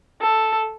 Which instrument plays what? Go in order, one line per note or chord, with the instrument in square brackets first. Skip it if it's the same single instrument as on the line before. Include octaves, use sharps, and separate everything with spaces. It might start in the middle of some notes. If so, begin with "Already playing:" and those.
[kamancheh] A4